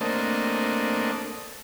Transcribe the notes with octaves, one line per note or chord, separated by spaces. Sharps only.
A3 A#3 C4 D4 D#5 A5